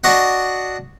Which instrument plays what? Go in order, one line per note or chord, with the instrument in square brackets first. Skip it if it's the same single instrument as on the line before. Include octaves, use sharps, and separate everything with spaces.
[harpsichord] D4 F#4 D#5 F#5